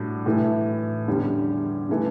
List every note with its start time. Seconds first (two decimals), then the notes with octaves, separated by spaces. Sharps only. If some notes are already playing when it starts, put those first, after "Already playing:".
Already playing: A2 G3 D4 F#4
0.26 A2 E3 A3
1.07 E2 D3 G3 C#4
1.89 C#3 E3 A3 E4